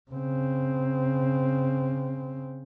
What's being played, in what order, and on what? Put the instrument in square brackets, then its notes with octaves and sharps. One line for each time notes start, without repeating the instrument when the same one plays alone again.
[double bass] C#3 C4